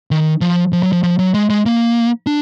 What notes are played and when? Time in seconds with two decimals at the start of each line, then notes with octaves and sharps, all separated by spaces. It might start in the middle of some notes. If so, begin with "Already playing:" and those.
0.11 D#3
0.41 F3
0.73 F3
0.83 F#3
0.92 F3
1.03 F3
1.19 F#3
1.34 G#3
1.50 G#3
1.66 A#3
2.27 D4